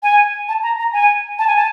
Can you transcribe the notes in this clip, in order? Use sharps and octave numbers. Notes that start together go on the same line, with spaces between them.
G#5
A5
A#5
A#5
G#5
A5
G#5
A5